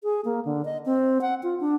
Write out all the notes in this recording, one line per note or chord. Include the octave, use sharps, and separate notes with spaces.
G#4
A#3
D3
D#5
C4
F#5
F4
D4